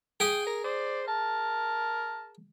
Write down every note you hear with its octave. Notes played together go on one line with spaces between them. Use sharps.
G#4 G5 D#6
A#4
C5 D5
A#4 A5